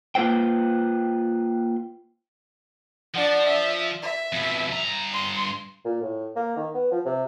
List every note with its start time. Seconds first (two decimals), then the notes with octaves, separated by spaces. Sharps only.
0.15 A#3 F4 B4 C5 G5
3.15 F3 D4 F#5
3.46 E5
4.02 E5
4.33 F2 B2
4.71 G2 A#5
5.13 C6
5.85 A#2
6.02 A2
6.36 A#3
6.56 D#3
6.74 B3
6.92 F3
7.05 C3